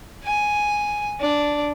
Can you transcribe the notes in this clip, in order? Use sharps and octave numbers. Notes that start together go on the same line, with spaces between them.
G#5
D4